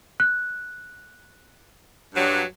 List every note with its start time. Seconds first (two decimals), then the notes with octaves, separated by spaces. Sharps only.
0.20 F#6
2.15 G2 F#3